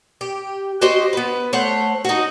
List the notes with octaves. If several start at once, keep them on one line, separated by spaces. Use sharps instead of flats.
G4
F#4 G4 C5 D#5
B3 B4
A3 C5 C#5 F#5
D#4 F#4